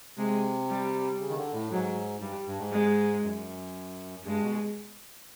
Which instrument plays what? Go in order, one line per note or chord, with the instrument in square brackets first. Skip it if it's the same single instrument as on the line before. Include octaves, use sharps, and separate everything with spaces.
[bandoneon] C3 [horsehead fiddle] G#3
[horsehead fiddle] G3
[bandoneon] C#3
D#3
D3
A2
[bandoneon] G#2 [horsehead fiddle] F#3
[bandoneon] G2 [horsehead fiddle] G3
[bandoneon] G2
G#2
[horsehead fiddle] G#3
[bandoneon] F#2
[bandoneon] G2 [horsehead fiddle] G#3
[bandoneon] B2